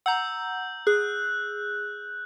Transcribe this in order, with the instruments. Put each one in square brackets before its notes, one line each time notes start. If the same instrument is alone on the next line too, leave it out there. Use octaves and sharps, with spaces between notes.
[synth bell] F#5 A#5 [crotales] E6 G6
[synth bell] G#4 [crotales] F#6